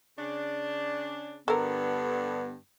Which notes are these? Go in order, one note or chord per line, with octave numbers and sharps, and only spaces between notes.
C#3 D4
G2 D3 B3 A4 A#4